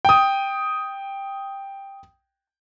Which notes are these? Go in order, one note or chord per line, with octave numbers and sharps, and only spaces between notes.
G5 D#6